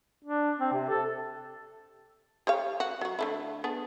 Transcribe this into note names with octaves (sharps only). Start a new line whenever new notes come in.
D4
C4
C3
A4
G4 C#5 F5
F#4
F#3 F#4
D3 A3 E4
B3 D4 G#4